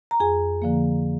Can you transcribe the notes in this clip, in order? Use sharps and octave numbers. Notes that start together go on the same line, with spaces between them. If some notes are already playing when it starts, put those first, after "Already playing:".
A#5
F2 G#4 G#5
D3 F3 A#3